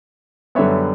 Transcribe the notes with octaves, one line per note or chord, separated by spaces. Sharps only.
F#2 D3 G3 B3 C#5 E5